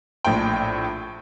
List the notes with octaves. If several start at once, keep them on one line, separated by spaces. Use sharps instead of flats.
A#1 A2 C5 G5